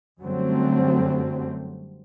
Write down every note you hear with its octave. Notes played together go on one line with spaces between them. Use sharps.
F#2 D3 F#3 G3 A3 C4